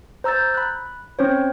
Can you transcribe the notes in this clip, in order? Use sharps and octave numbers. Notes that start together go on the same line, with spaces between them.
C5 A#5 E6 G6 A6
B5 F#6
C4 C#4 C5 C#5